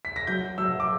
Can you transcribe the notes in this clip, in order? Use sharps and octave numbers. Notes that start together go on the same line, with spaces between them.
B6
A#6
F#3 G6
F#3 E6
D6